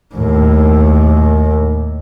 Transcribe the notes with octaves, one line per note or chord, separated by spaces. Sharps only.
D#2 A2